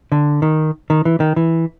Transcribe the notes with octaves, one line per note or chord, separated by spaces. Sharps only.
D3
D#3
D#3
E3
D#3
E3